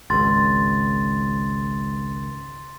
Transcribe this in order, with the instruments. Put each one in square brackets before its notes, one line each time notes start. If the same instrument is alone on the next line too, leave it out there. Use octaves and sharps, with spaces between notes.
[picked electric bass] G#1 C#2 [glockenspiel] C6 A6